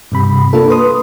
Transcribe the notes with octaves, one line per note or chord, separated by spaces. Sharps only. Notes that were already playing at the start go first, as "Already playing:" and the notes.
G2 C3 B5
A#3 D4 F4 A4
B4 C6 D#6